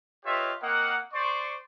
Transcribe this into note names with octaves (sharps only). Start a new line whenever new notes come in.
F4 G4 B4 C#5 D#5 E5
A#3 C4 A#4 D#5 F#5
C5 D5 C6 C#6